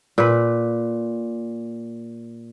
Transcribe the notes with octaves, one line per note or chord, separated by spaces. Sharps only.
A#2 B4